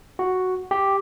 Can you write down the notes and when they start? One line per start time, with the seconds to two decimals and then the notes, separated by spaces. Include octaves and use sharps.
0.19 F#4
0.71 G4